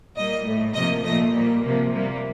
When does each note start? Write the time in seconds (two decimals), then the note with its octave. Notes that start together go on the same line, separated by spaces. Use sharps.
0.16 A#2 G3 A#3 D#5
0.45 A2 A3
0.74 C3 F3 A#3 D#5
1.04 A#2 F3 A3 D#5
1.34 A#2 G3 A#3
1.63 C3 F3 A#3
1.93 C3 G3 A#3